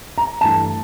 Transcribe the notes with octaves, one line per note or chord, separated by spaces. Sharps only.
A#5
G2 E3 A3 A5